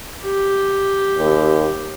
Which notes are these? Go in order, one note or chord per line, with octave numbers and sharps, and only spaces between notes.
G4
D#2